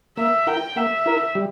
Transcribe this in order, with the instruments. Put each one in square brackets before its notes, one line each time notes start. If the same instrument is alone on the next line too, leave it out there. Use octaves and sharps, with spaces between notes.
[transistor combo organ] A#3 [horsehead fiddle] E5
[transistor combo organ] E4 A#4 [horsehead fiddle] G5
[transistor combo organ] A#3 [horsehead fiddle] E5
[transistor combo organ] E4 A#4
G3